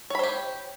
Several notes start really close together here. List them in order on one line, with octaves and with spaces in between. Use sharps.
C#5 B5 C5 G4